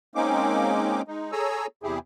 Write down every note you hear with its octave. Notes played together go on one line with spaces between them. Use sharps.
G#3 A#3 C4 C#4 D#4 D6
G#3 D#4
G#4 A4 C#5 G#5 A#5 E6
E2 C3 E4 G4 G#4